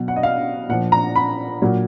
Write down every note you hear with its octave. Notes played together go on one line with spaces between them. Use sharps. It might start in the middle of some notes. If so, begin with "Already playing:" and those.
Already playing: B2 F#3
F#5
D#5
F5
A#2 F3 F#5
A#5
B5
A#2 F#3